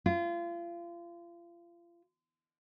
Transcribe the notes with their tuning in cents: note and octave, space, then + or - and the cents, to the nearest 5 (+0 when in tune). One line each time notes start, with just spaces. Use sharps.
F4 -35